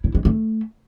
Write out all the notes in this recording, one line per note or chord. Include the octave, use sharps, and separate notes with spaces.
E4
G#3
A3